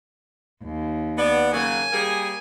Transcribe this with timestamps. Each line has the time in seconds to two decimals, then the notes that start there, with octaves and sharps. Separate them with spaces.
0.65 D#2
1.18 B3 D5
1.52 C#3 F#3 A#3 G#5
1.93 G3 A#3 G#4